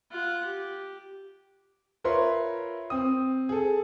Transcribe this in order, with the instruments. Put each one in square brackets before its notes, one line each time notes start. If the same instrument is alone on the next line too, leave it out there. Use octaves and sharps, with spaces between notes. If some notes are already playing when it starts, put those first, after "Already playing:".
[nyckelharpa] F4 F#5
G4
[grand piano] F4 A#4 B4 C#5 E5 C6
C4 D#6
G#4 A4